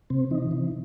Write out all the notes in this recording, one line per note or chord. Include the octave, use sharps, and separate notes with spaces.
C3 C4
E3 D#4
C3